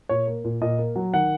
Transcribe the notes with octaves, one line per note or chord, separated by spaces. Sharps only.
A#2 C#5
A#3
A#2
A#2 D#5
A#3
F#3
D#3 F#5